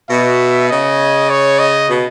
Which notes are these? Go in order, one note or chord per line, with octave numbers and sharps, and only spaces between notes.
B2 E5
C#3 D#5
C#5
D#5
B2